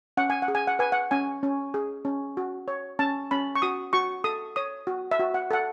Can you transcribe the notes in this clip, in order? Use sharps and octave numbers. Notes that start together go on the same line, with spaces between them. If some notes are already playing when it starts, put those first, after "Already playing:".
C#4 F#5
G#5
F#5
G#4
G#5
F#5
B4 G#5
F#5
C#4 G#5
C#4
G#4
C#4
F#4
C#5
C#4 A5
C#4 B5
C#6
F#4 D#6
F#4 C#6
A4 D#6
C#5 D#6
F#4
E5
F#4
F#5
A4 F#5